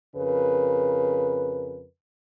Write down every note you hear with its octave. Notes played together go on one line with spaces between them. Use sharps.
F2 C#3 A#4 B4